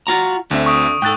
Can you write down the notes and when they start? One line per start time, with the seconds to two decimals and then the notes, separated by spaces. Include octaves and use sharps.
0.07 F4 F#4 A#5
0.51 D2 D3 C4 E5
0.66 C#6 D#6 D7
1.02 G#2 A4 G5 F#6 A6